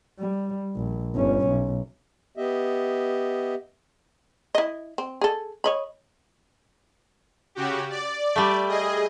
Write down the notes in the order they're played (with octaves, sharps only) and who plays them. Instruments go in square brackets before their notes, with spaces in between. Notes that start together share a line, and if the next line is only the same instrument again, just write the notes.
[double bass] G3
A#1
G1 C#4
B1
[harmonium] B3 G4 D#5 E5
[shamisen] E4 D#5
C4
G#4 A4
C#5 D#5 B5
[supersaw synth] C#3 F#4 G4
D5
[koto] G3 A3
[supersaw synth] G#4 D#5